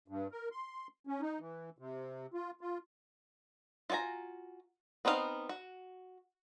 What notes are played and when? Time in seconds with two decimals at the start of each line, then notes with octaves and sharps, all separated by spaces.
0.08 G2
0.32 A#4
0.51 C6
1.07 C#4
1.21 D#4
1.39 E3
1.78 C3
2.34 F4
2.61 F4
3.90 F4 F#4 C#5 G#5 A#5
5.05 B3 C4 D#4 G#4 F5
5.49 F#4